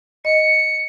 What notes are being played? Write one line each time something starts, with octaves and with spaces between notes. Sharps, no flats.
D#5 C#7